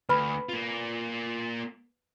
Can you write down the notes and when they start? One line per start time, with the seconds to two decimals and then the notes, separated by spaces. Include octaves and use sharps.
0.09 D2 B4 B5
0.49 A#3 F4